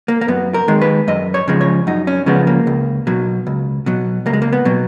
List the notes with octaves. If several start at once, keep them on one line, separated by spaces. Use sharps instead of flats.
A#3
A#3
F#2 B3
A#4
D#3 G#3
B4
F#2 D#5
C#5
C#3 F3 G#3
C#5
F#2 D#4
C#4
C#3 F3 G#3 B3
A#3
C#2
B2 F#3
C#2
B2 F#3
C#2 A#3
G#3
A#3
B3
B2 F#3